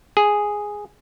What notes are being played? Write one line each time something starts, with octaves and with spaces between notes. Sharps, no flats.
G#4